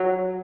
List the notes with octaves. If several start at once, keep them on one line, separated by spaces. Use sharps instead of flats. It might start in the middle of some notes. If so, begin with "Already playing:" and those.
Already playing: F#3